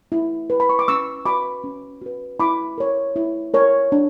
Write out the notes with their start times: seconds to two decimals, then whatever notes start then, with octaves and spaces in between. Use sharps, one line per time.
0.12 E4
0.50 B4
0.60 B5
0.69 C#6
0.79 D6
0.88 C#4 C#6 E6
1.25 F#4 B4 B5 D6
1.64 C#4
2.02 F#4 B4
2.40 E4 B5 D6
2.78 A#4 C#5
3.16 E4
3.54 A#4 C#5
3.92 D4